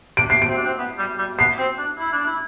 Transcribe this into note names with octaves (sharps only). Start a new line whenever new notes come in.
D4 D7
C7
D7
C4
D4
C4
B3
G3
G3
B3 C7
C4
D4
E4
D4
E4